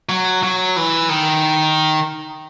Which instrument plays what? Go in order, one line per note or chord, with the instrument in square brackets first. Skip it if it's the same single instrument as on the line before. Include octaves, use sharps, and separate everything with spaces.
[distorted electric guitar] F#3
F#3
E3
D#3